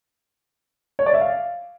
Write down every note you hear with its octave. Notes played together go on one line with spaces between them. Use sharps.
C#5
D5
E5
F5